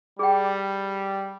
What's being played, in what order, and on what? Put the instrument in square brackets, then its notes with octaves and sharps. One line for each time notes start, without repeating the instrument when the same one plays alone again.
[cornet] G3 [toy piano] G#4 G5